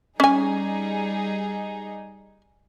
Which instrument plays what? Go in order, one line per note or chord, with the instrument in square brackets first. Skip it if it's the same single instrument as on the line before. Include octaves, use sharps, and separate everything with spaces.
[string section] G3 D#4 G#4 [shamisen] C#4 G#5